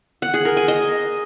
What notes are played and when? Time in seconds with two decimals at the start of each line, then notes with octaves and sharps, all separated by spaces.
0.22 F#5
0.34 G#4
0.45 A#4
0.57 G#5
0.68 D#5